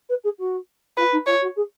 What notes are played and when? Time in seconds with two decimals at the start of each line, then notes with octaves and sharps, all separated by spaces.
0.09 B4
0.24 G#4
0.38 F#4
0.97 F4 B4
1.12 D#4
1.26 F4 C#5
1.41 F#4
1.56 G#4